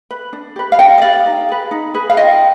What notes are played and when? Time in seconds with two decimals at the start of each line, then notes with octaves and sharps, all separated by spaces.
0.11 B4
0.33 D4
0.56 G4 B4
0.72 F5
0.79 D4 D#5 G5
0.98 D#5
1.02 G4 B4 D5 F5
1.26 D#4
1.49 G#4 B4
1.71 D#4
1.94 G#4 B4
2.10 F5
2.17 F4 D#5 G5